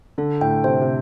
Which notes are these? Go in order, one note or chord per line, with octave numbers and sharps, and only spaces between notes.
D3 A4
A2 G5
C3 C5
C3